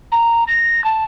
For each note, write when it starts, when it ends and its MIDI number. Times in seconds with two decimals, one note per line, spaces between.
0.12 0.44 82
0.48 0.84 94
0.84 1.04 81